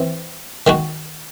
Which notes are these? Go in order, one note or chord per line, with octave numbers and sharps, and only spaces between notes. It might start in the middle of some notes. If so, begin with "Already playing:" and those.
Already playing: E3 C4
D#3 G#3 D#4 F#4